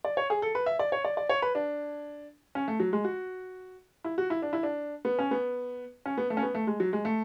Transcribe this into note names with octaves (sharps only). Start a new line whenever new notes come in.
D5
C#5
G#4
A4
B4
E5
D5
C#5
D5
D5
C#5
B4
D4
C#4
A3
F#3
G#3
F#4
E4
F#4
E4
D4
E4
D4
B3
C#4
B3
C#4
B3
A3
C#4
B3
A3
G#3
F#3
G#3
A3